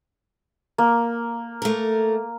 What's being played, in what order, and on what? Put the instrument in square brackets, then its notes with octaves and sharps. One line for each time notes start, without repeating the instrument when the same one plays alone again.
[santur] A#3
[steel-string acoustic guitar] A3 A#4